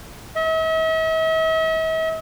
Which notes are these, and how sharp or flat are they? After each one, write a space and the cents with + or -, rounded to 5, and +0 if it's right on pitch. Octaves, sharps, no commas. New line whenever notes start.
E5 -45